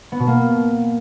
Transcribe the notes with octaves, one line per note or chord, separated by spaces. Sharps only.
B3
B2
A#3